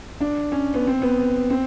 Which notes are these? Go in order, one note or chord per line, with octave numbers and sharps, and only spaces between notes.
D4
C#4
B3
C4
B3
C4